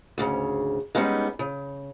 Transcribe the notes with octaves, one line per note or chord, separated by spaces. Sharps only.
D2 G#2 C#3
G3 G#3 B3 C#4 D#4
C#3